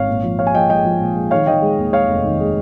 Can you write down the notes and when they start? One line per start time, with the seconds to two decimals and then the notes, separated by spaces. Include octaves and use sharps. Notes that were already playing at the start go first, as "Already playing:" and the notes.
Already playing: G#1 C#5 F5
0.08 A#2
0.23 F3
0.39 F3 C#5 F5
0.47 G#5
0.54 F3 D#5 G5
0.70 G#3 D#5 G5
0.85 F3
1.01 A#2
1.16 G#3
1.31 D#3 C#5 F5
1.46 D#3 D#5 G5
1.62 G#3
1.78 D#2
1.93 G#3 C#5 F5
2.08 F1
2.24 D#3
2.40 G#3